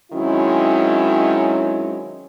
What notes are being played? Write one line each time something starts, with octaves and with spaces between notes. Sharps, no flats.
D#3 F#3 G#3 C4 C#4 E4